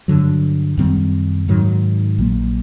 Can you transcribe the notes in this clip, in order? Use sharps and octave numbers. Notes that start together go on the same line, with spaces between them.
G2 D3 F#3
F#2 D#3 G3 C4
G#2 D#3 F#3
A#1 A#2 F#3 A#3